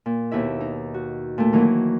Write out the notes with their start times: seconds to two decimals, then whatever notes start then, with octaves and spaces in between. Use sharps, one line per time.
0.06 A#2
0.31 D#2 B2 E4 E5
0.60 D#4
0.94 F#4
1.38 A#2 A3
1.52 D2 D#3 E3 F#3 A#3